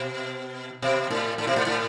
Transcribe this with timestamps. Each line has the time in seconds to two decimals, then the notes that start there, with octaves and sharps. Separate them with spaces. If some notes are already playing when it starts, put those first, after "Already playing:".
Already playing: B2
0.82 B2
1.10 A2
1.38 A2
1.47 B2
1.56 A2
1.67 A2